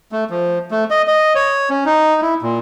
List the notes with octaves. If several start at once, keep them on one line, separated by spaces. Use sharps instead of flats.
A3
F3
A3
D#5
D#5
C#5
C#4
D#4
E4
A#2